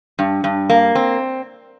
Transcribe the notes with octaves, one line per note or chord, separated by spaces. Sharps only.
G2
G2
A#3
C4